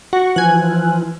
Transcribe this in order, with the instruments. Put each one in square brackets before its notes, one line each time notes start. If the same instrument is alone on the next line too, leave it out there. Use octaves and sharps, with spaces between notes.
[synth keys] F#4 [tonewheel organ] C#6
[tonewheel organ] E3 F3 [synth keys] G#5 F#6